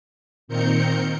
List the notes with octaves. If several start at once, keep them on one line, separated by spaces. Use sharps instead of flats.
A#2 D#3 C4 A#4 G6 C#7